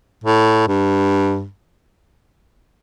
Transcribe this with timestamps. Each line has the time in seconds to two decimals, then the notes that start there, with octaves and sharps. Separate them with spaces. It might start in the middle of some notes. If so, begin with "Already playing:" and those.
0.24 A2
0.68 G2